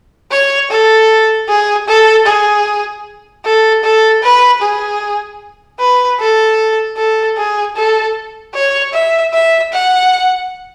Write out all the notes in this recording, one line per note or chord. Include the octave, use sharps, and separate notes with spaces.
C#5
A4
G#4
A4
G#4
A4
A4
B4
G#4
B4
A4
A4
G#4
A4
C#5
E5
E5
F#5